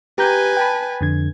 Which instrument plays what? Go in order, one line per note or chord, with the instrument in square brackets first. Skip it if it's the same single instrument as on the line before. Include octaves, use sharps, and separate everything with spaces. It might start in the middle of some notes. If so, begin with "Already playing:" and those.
[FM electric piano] G4 A#5 G6 [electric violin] B4 G#5
[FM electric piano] G5 A5 B5
F2 D3 G#6